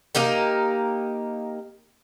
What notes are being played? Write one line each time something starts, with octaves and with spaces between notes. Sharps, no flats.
A#3 D#4 G4 A#4